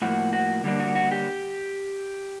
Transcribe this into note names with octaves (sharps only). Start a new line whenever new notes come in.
A2 F3 A#3 F#4
F#4
D3 G3 A#3 D4
F#4
F#4
G4